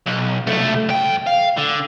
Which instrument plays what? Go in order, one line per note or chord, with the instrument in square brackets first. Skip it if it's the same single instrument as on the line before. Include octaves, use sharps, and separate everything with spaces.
[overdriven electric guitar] B1
C2 A3
F2 G5
F5
D3